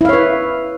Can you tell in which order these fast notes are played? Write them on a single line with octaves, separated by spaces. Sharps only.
E4 F5 C#5 B4